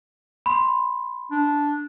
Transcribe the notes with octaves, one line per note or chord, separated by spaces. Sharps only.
B5 C6
D4